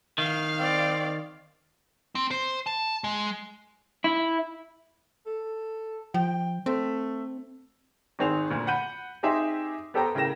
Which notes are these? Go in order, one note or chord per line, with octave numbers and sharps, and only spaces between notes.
D#3 F5
C4 D5
C4
C5
A5
G#3
E4
A4
F3 G5
A3 C4
G#1 D#3 C4 G#4 F7
D2 A#2
F#5 B5 G6 D#7
C4 D#4 G4 G#4 E5 C6
B3 G4 A4 C5 G5 A#5
A2 C#3 A#4 G5 A#6 E7